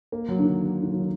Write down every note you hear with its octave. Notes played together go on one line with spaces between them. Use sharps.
A#3
F#3
D3
D#3
D#3
F#3
D#3